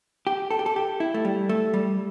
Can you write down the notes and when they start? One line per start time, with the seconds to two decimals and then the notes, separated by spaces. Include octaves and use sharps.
0.27 G4
0.51 A4
0.59 G4
0.66 A4
0.76 G4
1.00 E4
1.14 A3
1.25 G3
1.49 A3
1.74 G3